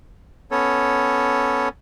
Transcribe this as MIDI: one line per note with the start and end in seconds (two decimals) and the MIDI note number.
0.51 1.68 59
0.51 1.68 61
0.51 1.68 69
0.51 1.68 73